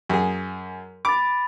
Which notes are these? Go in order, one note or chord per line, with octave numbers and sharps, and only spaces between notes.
F#2 G#4
B5 D6 A6